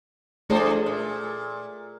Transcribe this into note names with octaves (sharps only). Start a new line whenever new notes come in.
E3 A3 D4 G#4 C5 D5
A#2